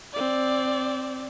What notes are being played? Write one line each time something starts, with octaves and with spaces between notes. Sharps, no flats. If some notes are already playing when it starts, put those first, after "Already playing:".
C4 D5